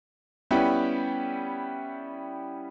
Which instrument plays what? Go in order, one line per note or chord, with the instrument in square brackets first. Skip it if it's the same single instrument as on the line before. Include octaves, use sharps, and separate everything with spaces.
[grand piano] G3 B3 C#4 E4 G4